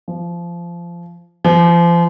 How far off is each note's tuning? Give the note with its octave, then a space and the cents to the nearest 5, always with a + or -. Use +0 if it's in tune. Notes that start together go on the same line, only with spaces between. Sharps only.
F3 -20
F3 -35